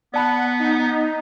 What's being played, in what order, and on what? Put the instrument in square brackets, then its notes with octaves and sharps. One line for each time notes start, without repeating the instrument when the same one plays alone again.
[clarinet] B3 [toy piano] D5 A5 B5 [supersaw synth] F#5
[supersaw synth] D#4